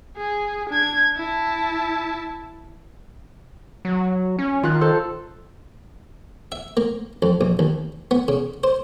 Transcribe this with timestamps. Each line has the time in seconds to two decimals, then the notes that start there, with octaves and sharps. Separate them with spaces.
0.18 G#4
0.70 D4 G#6
1.17 E4 A5
3.85 F#3
4.39 C#4
4.63 D#3 F4 F#6
4.81 A4 C5
6.52 E5
6.77 A#3
7.22 F2
7.41 A#1
7.59 D#2
8.11 B3
8.28 C#3
8.64 C5